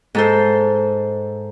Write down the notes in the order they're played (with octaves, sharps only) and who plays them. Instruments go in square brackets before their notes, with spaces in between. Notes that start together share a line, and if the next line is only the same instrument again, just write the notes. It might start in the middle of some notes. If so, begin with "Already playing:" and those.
[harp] G#2 A4 C5